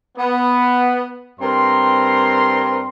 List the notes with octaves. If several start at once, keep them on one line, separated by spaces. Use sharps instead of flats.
B3
G2 C4 A#4 A#5 C6